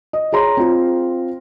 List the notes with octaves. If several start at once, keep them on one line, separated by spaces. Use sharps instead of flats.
D#5
G#4 C#5 A#5 C6
C4 F4